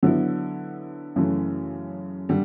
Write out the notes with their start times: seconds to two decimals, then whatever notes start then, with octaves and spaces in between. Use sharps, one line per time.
0.03 D3 F#3 B3 E4
1.16 F#2 C#3 E3 A3
2.29 D3 G3